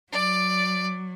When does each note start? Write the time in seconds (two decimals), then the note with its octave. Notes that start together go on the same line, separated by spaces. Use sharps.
0.12 F#3 D5